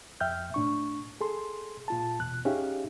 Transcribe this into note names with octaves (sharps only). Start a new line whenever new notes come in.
F2 E5 G5 F6 G6
A2 D4 C#6
G#4 A4 C6
A#2 F4 A5
E2 B2 F#6
C#4 D#4 G4 G#4 E5 F5